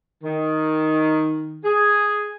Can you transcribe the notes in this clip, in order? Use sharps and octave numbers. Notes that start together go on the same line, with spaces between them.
D#3
G#4